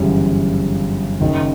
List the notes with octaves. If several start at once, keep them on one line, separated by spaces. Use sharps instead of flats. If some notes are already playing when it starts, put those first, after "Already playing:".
Already playing: G1 F#2 C#3 E3 G3
F#1 F#2 D#3 F#3